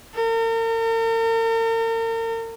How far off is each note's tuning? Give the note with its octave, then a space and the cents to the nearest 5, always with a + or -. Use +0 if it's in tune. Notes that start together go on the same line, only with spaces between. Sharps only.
A#4 -40